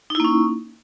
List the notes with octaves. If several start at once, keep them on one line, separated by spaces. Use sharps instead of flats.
A#3 C#4 D#4 E4